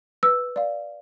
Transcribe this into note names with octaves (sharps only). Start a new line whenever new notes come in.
B4 E6
D5 F5